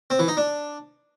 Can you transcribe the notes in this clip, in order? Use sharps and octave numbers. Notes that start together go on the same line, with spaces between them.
C4
E3
D#4
D4